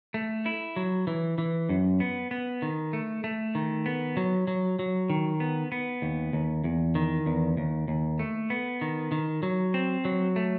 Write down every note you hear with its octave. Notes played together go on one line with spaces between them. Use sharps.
A3
E4
F#3
E3
E3
F#2
B3
B3
D#3
A3
A3
D#3
B3
F#3
F#3
F#3
D#3
B3
B3
D#2
D#2
E2
D#3
E2
D#2
D#2
A3
B3
D#3
D#3
F#3
C4
F#3
A3